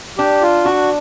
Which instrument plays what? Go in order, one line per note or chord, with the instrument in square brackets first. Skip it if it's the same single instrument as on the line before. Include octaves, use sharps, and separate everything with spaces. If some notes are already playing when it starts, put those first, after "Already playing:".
[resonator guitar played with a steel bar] D4 [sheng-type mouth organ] G4
[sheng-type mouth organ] F4
[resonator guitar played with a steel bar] D4 [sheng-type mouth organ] F#4